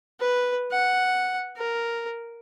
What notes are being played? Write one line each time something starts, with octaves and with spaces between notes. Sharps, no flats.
B4
F#5
A#4